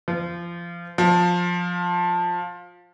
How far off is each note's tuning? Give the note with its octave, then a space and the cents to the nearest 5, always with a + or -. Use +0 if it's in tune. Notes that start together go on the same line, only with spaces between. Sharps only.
F3 -25
F3 +15